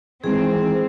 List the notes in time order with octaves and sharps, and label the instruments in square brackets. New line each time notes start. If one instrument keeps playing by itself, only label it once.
[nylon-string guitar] D#3 E3 G#3 [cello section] C4 [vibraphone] G#4